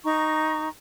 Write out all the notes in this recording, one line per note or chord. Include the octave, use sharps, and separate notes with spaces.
D#4 A#5 C#6